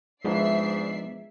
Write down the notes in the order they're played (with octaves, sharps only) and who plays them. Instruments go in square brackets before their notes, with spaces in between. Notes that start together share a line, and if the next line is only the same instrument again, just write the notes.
[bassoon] G#2 [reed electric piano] F3 B3 D4 [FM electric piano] G#3 [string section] D5 E5 C7